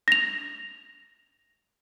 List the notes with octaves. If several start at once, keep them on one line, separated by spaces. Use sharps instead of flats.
A#6 F7